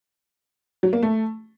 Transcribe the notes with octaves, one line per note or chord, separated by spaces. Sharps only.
F#3
A#3
A3